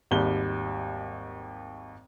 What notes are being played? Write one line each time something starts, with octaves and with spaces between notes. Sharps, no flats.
G#1 D#2 G3 G7